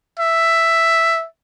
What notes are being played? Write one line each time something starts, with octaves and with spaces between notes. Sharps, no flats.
E5